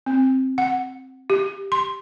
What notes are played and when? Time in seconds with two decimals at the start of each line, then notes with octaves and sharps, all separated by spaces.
0.06 C4
0.58 F#5
1.30 G4
1.72 C6